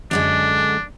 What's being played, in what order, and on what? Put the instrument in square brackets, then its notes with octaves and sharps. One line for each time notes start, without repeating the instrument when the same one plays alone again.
[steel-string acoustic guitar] F#2 D3 G#3 [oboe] D4